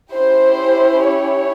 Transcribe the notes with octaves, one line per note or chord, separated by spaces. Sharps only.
C#4 E4 G4 C5
C#5